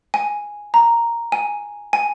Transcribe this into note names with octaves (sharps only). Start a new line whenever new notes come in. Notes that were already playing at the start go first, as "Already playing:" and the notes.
G#5
A#5
G#5
G#5